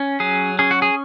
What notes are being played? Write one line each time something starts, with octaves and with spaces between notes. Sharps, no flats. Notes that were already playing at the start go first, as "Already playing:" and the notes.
Already playing: C#4
F#3 G#4
C#4 G#4
F#4
G#4